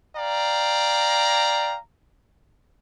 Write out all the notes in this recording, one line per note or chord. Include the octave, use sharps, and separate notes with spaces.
D5 F5 G5 A#5